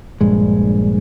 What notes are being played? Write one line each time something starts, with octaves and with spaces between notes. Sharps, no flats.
A#1 G2 G#3